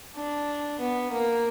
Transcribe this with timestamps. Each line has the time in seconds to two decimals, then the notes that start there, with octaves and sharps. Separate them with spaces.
0.16 D4
0.80 B3
1.11 A#3